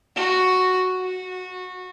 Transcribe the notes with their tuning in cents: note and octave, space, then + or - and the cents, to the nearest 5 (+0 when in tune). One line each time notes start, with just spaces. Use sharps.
F#4 +0
F#4 -20